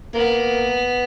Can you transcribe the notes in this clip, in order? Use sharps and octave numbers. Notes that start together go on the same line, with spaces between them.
A#3 B3